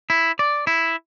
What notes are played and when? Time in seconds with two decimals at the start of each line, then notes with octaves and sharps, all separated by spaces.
0.10 E4
0.39 D5
0.67 E4